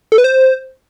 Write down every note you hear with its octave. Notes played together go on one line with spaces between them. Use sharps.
A4
B4
C5